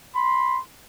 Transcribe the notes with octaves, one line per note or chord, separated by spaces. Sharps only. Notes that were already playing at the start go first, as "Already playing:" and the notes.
B5 C6